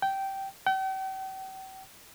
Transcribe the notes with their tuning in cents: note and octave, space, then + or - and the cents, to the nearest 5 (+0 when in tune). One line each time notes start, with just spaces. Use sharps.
G5 -10
G5 -40